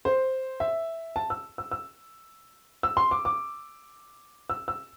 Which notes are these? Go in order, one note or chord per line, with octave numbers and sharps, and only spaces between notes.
C5
E5
A5
E6
E6
E6
E6
C6
D6
D6
E6
E6